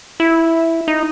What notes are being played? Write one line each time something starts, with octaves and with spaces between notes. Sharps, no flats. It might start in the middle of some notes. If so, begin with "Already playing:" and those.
E4
D#4